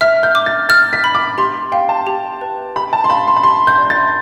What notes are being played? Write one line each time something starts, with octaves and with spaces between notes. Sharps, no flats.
E5 F6
G6
D6
A6
F6 A6
B6
B5
D6
G4 C6
F5 G5
A5
G4
B4
G4 B5
A5
C6
F5 B5
C6
B5
G4 C6
G6
D5
A6